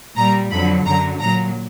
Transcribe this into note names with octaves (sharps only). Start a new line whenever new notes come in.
A#2 G3 A#5
F2 D3 F#3 B5
F#2 D3 F#3 A#5
A#2 F#3 A#5